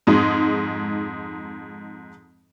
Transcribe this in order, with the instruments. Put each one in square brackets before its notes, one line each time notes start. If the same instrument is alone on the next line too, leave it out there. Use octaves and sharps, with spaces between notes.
[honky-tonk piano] F2 G#2 G#3 D#4